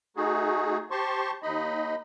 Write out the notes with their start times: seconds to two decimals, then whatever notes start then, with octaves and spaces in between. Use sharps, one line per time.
0.17 A3 D#4 F#4 G#4
0.91 G4 C5 A5 C6 C#6
1.43 D#2 D#4 D#5 B5